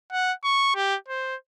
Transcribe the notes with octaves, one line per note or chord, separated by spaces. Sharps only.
F#5
C#6
G4
C5